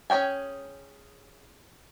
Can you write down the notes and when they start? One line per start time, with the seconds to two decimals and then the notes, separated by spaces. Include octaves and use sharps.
0.10 C#4 G#4 D5 G5 G#5